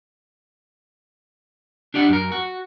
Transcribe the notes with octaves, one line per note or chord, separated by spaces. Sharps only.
D4 G4 D5 F#5
F#2 A#4
F#4